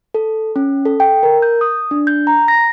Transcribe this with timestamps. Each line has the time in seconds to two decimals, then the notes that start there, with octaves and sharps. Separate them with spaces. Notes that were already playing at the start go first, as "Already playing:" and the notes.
0.14 A4
0.56 C#4
0.85 A4
1.00 G5
1.23 A#4
1.42 G6
1.61 D#6
1.91 D4
2.07 G6
2.27 A#5
2.48 A#6